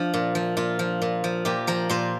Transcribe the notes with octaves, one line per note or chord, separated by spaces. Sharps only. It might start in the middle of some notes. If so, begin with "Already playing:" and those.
Already playing: F3 D4
A#2
F3
A#2 F4
F3
A#2
F3
A#2 G4
F3 A#4
A#2 C5